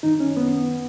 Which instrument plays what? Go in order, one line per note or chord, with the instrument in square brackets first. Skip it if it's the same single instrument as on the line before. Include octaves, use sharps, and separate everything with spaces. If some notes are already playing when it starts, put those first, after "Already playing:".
[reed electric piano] F#2 D#3 D#4
C#4
B3